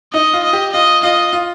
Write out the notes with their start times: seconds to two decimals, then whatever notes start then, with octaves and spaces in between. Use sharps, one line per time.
0.13 D#4 D#5
0.33 F4
0.44 D#5
0.53 G4
0.73 F4 D#5
1.03 F4 D#5
1.33 F4